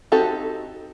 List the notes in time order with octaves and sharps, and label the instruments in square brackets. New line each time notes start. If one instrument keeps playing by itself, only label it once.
[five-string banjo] C4 D#4 F#4 G4 A4